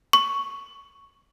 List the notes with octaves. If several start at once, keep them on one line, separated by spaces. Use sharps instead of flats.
C#6